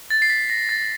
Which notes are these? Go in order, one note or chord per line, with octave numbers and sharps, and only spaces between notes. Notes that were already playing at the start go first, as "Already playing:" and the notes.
A6
C7
B6
A#6
A6